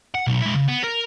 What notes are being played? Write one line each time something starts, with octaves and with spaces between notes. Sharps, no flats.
F#5
B1
G#3 E4
C#3
B3
A#4